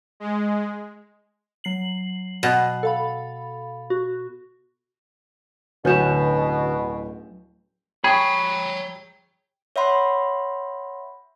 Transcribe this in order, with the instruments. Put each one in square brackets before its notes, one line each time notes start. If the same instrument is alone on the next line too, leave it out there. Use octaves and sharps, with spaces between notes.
[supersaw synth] G#3
[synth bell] F#3 C7 F#7
[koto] B2
[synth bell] A4 F5 B5
F#4
[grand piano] D1 G6 E7 [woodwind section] B2 [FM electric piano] D3 [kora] C#4 F#4 B4
[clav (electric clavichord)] G#4 [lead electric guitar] C#5 A#5 [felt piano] G5 [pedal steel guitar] B5 C#6
[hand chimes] C#5 E5 F#5 B5 C6